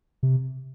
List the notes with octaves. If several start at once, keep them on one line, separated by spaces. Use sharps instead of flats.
C3